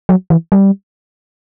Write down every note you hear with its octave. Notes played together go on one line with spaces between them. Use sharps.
F#3
E3
G3